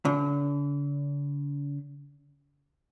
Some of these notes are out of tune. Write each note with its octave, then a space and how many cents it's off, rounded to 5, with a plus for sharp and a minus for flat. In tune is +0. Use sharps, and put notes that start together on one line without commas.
D3 -45